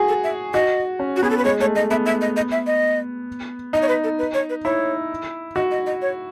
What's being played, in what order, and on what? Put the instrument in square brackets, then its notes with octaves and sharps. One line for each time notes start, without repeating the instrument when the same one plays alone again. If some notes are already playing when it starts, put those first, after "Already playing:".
Already playing: [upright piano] F#4 G#4
[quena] A4
E5
[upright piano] F#4 [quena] D#5
[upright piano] C#4
[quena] F#4
[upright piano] B3 [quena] G#4
[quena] A4
B4
[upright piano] G#3 [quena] C#5
[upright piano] A3 [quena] C#5
[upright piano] A3 [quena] D#5
[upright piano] B3 [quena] E5
[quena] E5
D#5
D#5
E5
D#5
[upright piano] D#4 [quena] D#5
[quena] C#5
B4
A4
B4
C#5
B4
[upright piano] E4 [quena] C#5
[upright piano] F#4 [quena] D#5
[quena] D#5
D#5
C#5